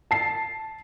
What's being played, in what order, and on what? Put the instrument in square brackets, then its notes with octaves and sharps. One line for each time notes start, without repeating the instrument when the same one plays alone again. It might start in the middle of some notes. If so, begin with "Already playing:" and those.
[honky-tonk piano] A5 C7